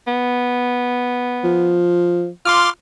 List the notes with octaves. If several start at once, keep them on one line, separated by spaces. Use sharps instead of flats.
B3
F3
F4 C6 D6 F6